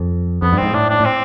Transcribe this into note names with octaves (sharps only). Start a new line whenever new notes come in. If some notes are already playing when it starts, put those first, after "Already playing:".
Already playing: F2
F2 B3
G2
C4
G#2
A2 D4
D4
A2
C4